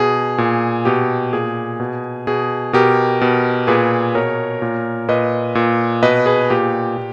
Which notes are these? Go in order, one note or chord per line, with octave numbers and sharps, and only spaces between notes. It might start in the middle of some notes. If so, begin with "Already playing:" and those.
Already playing: B2 G#4
A#2
B2 G4
A#2 G#4
B2
B2 G#4
B2 G4 A#4
B2
A#2 G#4 B4
B2 A#4 C#5
A#2
A#2 B4 D#5
A#2
B2 B4 D#5
G#4 B4
A#2 G4
A#2